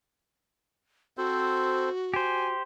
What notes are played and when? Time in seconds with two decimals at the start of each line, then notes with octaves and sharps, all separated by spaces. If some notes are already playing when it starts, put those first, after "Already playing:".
1.17 C4 F#4 A4 C5
2.14 G4 C5 G#5